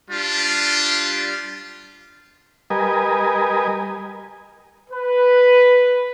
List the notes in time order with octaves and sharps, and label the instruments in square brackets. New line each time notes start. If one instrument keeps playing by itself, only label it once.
[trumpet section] G3 D4 F4
[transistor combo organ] G3 A#4 B4 D#5 G#5
[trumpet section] B4